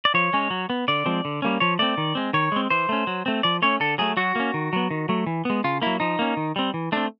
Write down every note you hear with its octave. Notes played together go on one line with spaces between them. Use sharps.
D5
F3 C#5
G#3 C#4
F#3
B3
D3 D5
F3 G#3 C4
D3
G3 A#3 C#4
F3 C#5
A3 C4 D5
D#3
G#3 C4
D#3 C#5
G#3 C4
E3 C5
A3 C#4
F#3
A3 C4
F3 D5
A3 C#4 C#5
D3 A4
F#3 A3 G#4
F#3 F#4
A#3 C#4
D#3
F#3 B3
D#3
F#3 A3
E3
G#3 B3
C#3 F4
F#3 A#3 E4
F3 D#4
A#3 C#4
D#3
G3 C4
E3
A3 C4 D4